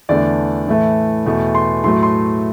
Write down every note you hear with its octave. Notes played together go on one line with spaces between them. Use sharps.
E2 D3 A3 D5
A2 E3 A3
E2 B2 A3
C6
A2 F#3 A3 C6
C6